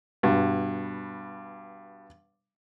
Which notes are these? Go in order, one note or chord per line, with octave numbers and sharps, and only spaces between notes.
G2 B2